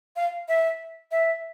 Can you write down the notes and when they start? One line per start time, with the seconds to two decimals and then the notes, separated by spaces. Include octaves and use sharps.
0.16 F5
0.48 E5
1.11 E5